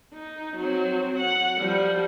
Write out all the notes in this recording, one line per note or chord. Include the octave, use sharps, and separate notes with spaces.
D#4
F#3 C4
F#5
F3 G3